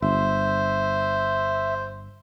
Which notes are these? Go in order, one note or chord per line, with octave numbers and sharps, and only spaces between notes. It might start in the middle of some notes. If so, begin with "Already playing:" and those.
G1 C5 E5